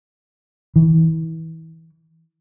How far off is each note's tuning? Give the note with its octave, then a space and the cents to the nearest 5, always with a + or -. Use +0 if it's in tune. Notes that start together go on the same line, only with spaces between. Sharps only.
E3 -30